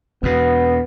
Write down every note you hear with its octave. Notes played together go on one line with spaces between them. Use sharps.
E2 B2 B3